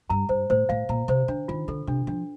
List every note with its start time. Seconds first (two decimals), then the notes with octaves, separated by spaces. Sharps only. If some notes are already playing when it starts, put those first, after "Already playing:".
0.10 G2 A#5
0.29 G2 C5
0.50 A2 C5
0.69 A2 F5
0.89 A#2 A#5
1.08 C3 C5
1.28 D3 D4
1.48 D#3 F4
1.68 D3 A4
1.87 C3 D4
2.07 F3 D4